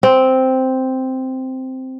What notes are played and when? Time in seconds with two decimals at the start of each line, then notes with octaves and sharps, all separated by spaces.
0.03 C4